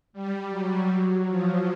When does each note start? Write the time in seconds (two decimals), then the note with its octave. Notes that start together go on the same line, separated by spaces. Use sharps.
0.13 G3
0.50 F#3
1.27 F3